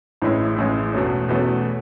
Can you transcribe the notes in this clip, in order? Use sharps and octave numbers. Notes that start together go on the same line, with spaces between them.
A1 A2 G#3 C#4 E4
A1 A2 G#3 C#4 E4
E2 B2 A3 C#4
E2 B2 A3 C#4